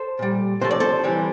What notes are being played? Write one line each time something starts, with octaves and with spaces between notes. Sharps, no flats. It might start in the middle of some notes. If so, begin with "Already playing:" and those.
Already playing: A4 C5
A#2 G3
C3 F3 A3 C5
D5
A4 C5
C3 E3 G3